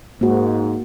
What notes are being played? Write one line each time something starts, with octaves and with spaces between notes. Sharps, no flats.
G#2 A#3 F#4